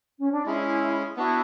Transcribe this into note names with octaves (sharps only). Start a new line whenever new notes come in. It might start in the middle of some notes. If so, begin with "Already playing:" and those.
C#4
D4
G#3 C#4 E4 G#4
B3 D4 E4 F#4